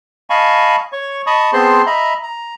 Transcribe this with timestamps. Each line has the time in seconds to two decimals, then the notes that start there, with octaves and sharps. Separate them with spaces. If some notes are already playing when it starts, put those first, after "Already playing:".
0.30 D#5 F5 G#5 A5 B5 C#6
0.92 C#5 C#6
1.27 D#5 A5 B5 C#6 D#6
1.53 B3 C4 G#4 C5 A5 C6
1.86 D#5 E5 A#5 B5
2.23 A#5